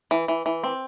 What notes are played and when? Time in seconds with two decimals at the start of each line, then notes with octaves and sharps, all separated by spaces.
0.11 E3
0.28 E3
0.46 E3
0.64 C4